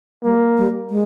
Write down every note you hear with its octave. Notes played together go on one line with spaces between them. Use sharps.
G3 A#3
G3
G#3